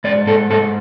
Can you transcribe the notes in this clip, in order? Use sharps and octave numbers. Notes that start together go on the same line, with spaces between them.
G#2 D5
G#2 A4
G#2 A4